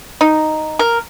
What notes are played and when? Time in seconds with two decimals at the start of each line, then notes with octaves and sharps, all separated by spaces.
0.21 D#4
0.79 A#4